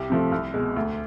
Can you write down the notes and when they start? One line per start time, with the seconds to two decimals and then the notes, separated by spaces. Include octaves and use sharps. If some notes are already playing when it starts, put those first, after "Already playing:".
Already playing: C2 G4
0.10 C3 F3 A3
0.32 C2
0.54 B2 G#3
0.76 D2